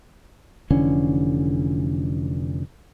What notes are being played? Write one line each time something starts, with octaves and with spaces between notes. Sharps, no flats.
F1 D3 E3 C#4